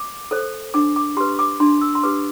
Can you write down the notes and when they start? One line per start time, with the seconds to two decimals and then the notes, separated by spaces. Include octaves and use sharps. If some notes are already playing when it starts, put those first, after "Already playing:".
Already playing: D6
0.31 A4 C5
0.74 D4 D6
0.96 D6
1.17 G4 B4 C6
1.39 D6
1.60 D4 C6
1.81 E6
1.95 C6
2.03 G4 B4 D6